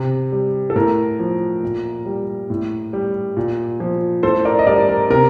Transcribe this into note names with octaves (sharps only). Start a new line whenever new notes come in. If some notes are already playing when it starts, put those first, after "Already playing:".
Already playing: C3
G3
A4
A2 A#4
F3
A#2
G3
A2
G3
A#2
F3
A2 A4 C5
A#4 D5
D#5
G3 A#4 D5
A#4
C3 A#4